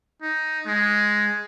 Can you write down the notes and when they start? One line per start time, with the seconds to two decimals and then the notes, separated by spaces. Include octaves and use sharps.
0.22 D#4
0.66 G#3